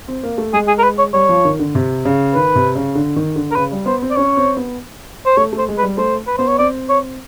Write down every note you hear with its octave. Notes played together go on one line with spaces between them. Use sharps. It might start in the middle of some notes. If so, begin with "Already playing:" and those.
C4
A#3
A3
G#3 G#4
G#4
A#4
B4
C#5
G3 C#5
F3
D#3
D3
C3
C#3
D#3 B4
C3
C#3
D3
D#3
D3
A#4
C#3 B4
G3
B3 C5
C4
D5
C#4 C#5
C4
B3
C5
A3 C#5
A3
C5
G#3
B4
G3
A3 C5
B4
B3 C5
C#5
C4 D5
C#5